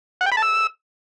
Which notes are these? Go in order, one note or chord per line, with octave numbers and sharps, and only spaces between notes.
F#5
G5
B5
A5
E6